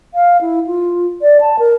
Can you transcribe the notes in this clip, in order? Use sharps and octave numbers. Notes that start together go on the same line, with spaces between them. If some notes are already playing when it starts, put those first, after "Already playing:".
F5
E4
F4
D5
A5
A#4